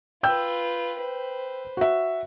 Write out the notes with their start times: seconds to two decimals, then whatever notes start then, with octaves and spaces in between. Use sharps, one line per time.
0.23 F4 B4 G5 E6 G6
0.99 B4 C5
1.77 F#4 E5